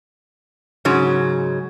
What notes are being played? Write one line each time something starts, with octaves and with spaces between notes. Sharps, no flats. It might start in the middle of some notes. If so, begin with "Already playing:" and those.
G#2 C#3 F#3